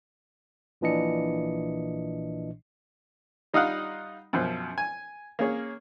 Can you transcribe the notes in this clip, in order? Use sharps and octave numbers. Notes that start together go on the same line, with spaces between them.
A#1 A#2 E3 D4 D#5 C#7
G3 D#4 F4 D#5 F5 F#5
F#2 B2 F3
G#5
A#3 C#4 G#4 C#5